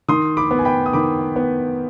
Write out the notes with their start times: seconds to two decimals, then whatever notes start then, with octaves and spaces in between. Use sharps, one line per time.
0.08 D#3 C6 D#6
0.37 B5 D6
0.51 B3
0.59 G#5
0.65 G5 B5
0.86 D#6
0.93 D#3 B5 D6
1.36 B3